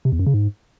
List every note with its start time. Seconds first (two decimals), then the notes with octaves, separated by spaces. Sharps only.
0.05 C3
0.12 E2
0.19 F#2
0.27 C#3
0.34 G#2